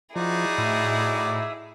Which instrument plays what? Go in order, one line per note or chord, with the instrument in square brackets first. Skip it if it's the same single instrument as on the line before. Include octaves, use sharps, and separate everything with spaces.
[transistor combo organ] F3 [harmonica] D#4 F#4 D5 [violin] E4 G#4
[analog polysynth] A2 [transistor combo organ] E5